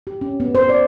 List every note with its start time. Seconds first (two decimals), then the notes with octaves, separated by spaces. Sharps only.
0.07 G4
0.21 C#4
0.40 B3
0.55 C5
0.69 D5